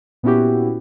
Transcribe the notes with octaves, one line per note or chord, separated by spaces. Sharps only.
A#2 B3 C#4 E4 F#4 G4